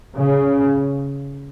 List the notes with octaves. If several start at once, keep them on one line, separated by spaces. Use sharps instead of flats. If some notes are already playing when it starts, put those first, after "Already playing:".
C#3